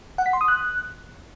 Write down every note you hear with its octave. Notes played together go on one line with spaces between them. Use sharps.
F#5
B6
C6
D#6
F#6